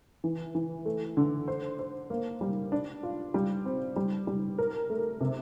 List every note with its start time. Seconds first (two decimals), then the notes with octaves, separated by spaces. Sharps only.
0.24 E3
0.55 E3
0.86 A3
1.17 D3
1.48 C5
1.79 C5
2.10 A#3
2.41 G3
2.72 D4
3.03 F4
3.34 G3
3.66 C4
3.96 G3
4.27 G3
4.58 A#4
4.90 A3
5.21 C3